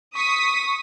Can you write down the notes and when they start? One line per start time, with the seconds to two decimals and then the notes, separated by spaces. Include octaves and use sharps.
0.15 C#6 D#6 B6